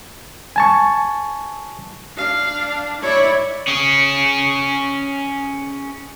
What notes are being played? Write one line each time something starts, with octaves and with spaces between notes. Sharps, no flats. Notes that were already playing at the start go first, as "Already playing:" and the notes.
G#5 A5 C#6
D4 F5
E4 C#5 D5
C#4 G#4